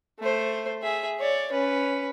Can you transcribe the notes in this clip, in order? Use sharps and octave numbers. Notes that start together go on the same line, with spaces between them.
A3 C5
G#4 E5
C#5 D5
C#4 B4